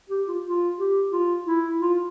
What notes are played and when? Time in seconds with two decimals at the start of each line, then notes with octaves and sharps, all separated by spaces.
0.09 G4
0.27 F4
0.44 F4
0.78 G4
1.12 F4
1.46 E4
1.80 F4